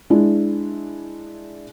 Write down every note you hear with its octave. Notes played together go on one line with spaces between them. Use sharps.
G#3 D4 E4